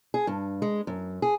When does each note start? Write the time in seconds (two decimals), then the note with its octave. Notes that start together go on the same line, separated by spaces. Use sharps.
0.14 G#4
0.27 G2
0.62 G#3
0.87 F#2
1.22 G#4